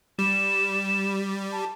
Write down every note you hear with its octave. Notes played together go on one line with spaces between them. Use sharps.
G3 E7
A5